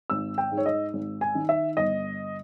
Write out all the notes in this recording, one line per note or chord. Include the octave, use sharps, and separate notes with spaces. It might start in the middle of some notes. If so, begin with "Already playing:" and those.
G#1 E6
G5
G#2
C#5
D#5
G#1
G#5
D#3
E5
G1 D#5